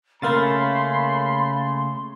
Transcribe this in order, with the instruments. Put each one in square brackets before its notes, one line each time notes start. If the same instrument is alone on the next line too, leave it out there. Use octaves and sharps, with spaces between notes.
[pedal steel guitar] C#3 A3 C#4 [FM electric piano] A#3 F5 A6 [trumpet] B5 [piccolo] C6